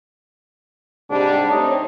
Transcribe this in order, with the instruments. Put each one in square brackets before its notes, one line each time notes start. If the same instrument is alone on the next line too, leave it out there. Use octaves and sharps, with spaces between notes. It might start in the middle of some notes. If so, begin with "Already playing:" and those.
[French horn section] G#2 C3 G3 [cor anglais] D4
[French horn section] A3 C4 C#5 [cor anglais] D#4